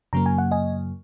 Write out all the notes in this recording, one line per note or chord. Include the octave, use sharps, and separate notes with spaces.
F#2 C#3 F#3 A#3 A#5
G#5
F#5
D#5 G#5